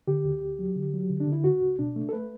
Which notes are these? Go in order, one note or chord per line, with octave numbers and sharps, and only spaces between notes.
D3 G4
D2
D2
F#3
D3
F#3
D3
D4
D3
E4
C#2 F#4
C#2
B2 D4
A3
A4
A3 B4